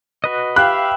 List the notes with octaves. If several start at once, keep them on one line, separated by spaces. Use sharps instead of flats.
F#4 B4 D#5
G4 B4 E5 F5 G5 B5 F#6